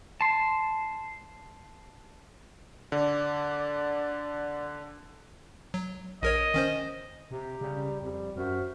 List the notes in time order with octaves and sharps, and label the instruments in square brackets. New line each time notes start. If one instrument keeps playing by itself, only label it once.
[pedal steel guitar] A5 C6
[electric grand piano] D3 [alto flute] D5
[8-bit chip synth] F#3
[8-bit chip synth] A#1 A#4 C#5 [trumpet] D#5
[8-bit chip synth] D#3 C#4 C5
[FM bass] C3 [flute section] G4 A#5
[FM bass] C#3 [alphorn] G3
[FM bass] F2 [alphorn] G3
[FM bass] F#2 [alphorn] F#4 [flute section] C5 E5 F6